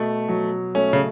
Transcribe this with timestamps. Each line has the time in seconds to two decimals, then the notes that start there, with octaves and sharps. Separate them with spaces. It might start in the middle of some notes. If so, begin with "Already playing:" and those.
Already playing: B2 A3
0.28 F#3
0.75 A3 C#4
0.93 C#3